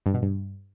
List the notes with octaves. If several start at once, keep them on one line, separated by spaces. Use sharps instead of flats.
G2
B2
G2